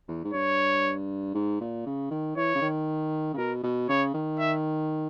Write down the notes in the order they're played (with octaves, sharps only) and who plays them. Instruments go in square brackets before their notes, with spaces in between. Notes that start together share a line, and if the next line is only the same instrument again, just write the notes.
[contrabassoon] E2
G#2
[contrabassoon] G2 [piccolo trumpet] C#5
[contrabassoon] G#2
A#2
C#3
D#3
[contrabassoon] E3 [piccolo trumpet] C#5
[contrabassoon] C#3
D#3
C#3
[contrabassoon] B2 [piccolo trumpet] A#4
[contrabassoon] B2
[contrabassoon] C#3 [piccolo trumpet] C#5
[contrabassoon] D#3
[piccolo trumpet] E5